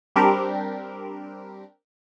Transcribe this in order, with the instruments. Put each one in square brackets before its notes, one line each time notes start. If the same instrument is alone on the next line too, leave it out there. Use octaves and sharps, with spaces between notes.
[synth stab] G3 C4 D4 G4 A#4